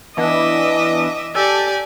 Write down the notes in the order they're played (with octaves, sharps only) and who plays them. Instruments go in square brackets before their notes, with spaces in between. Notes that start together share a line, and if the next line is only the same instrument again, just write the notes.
[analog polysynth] E3 B3 D4 [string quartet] D#5 E5 D6
[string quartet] G4 D5 G#5 [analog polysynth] A4